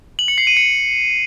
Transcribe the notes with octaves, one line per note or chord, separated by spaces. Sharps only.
F#7
C#7
C7
D#7
C#7